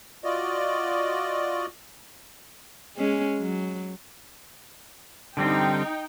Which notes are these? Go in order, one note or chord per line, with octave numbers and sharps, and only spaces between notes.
F4 F#4 D5 D#5
G#3 C#4
F#3
D3 G3 C4 D#4 G5